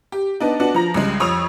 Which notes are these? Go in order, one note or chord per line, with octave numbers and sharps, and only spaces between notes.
G4
B3 D4 D#4
B3 D4 F#4
F3 A#5 A#6
C2 C#3 G#3
F2 C#5 D#6 E6 F7